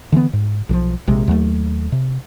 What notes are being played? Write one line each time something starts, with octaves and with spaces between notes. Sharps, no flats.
D3 E3 A#3 B3
G#2
B1 E3 F3
A#1 C3 G#3
D#2 F#3 A3
C3